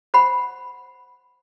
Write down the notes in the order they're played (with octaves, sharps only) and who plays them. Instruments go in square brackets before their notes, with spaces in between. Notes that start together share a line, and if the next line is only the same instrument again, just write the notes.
[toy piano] C5 F#5 B5